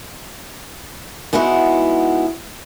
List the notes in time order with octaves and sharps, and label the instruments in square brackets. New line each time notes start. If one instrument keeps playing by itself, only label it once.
[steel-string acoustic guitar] G#3 B3 D#4 E4 F#4